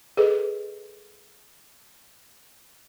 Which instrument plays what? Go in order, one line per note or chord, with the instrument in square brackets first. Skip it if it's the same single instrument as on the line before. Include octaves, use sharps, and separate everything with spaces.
[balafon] G#4 A4 B4 D#5